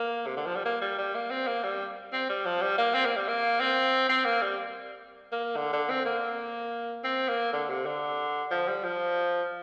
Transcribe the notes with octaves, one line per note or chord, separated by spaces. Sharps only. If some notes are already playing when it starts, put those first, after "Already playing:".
Already playing: A#3
C3
D3
F3
G3
A#3
G3
G3
A#3
C4
A#3
G3
C4
G3
F3
G3
A#3
C4
A#3
G3
A#3
C4
C4
A#3
G3
A#3
D3
D3
C4
A#3
C4
A#3
D3
C3
D3
F3
G3
F3